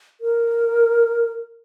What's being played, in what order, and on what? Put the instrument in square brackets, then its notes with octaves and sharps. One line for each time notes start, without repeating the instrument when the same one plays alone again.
[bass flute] A#4